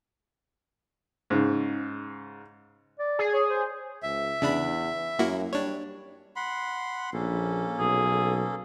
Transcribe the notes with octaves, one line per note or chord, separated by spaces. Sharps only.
G#2 C#3
D5
G#4
C#5
C5
C#2 E5
E2 C#3 D4 B5
F#2 A#3 E4 F#4
G3 D4 C#5
F#5 B5 C6
A#1 A#3 C#4 A4
B1 G#4